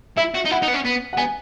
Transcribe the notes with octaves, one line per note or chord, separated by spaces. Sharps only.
E4 E5
F#4
D#4
E4 F#5
D#4
B3
C#4
B3
F#5
B3 G#5